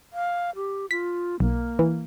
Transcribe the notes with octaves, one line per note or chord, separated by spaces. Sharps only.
F5
G4
F4 B6
B1 A#3
E3